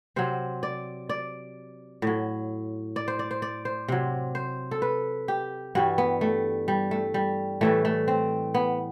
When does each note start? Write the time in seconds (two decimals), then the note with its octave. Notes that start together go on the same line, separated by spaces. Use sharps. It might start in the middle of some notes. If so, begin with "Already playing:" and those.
0.16 C3 F#3 C5
0.63 D5
1.09 D5
2.02 A2 F#3
2.96 D5
3.08 C5
3.19 D5
3.31 C5
3.42 D5
3.65 C5
3.88 C3 F#3
4.35 C5
4.71 A4
4.82 B4
5.28 G4
5.75 G2 E3 G3 F#4
5.98 B3
6.21 A3
6.68 G3
6.91 A3
7.14 G3
7.61 A2 E3 G3 A3
7.85 A3
8.08 C4
8.54 B3